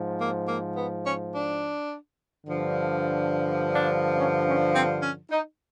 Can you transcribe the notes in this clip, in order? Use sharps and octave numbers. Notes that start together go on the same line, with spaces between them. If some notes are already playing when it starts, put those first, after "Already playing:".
Already playing: G#2 F3
A#3
A#3
B3
C#4
D4
G2 D3 F3
D4
C#4
C#4
C4
C#4
D#4